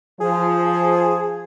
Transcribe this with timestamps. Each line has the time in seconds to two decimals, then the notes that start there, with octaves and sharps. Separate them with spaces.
0.21 F3 G#4